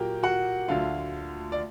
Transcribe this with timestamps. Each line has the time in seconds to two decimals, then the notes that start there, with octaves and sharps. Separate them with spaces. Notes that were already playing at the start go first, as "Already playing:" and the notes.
Already playing: A#2 F#3 A#3 G4 G5
0.23 F#4 F#5
0.68 D2 D3 F#3 F4 F5
1.52 D5